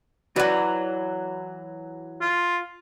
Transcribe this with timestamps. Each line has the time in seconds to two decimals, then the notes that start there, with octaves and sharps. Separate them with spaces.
0.36 E3 F#3 F#4 B4 D5
2.21 F4